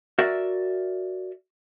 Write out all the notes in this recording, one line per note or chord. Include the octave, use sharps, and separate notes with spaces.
F#4 A#4 D5 E5